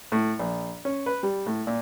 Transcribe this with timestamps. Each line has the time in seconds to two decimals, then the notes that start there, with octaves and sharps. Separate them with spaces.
0.12 A2
0.40 A#1
0.85 C#4
1.06 B4
1.23 G3
1.46 A2
1.67 A#2